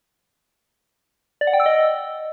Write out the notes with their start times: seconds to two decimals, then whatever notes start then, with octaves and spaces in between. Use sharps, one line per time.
1.41 D5
1.47 F#5
1.53 G5
1.60 E6
1.66 D#5